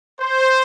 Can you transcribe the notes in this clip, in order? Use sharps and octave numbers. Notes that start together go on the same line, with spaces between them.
C5